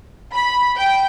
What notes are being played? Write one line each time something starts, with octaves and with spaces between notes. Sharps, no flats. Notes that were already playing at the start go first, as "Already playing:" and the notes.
B5
G5